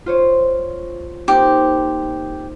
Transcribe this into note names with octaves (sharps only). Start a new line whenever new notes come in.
F4 C5 C#5
A#3 C4 D#4 G4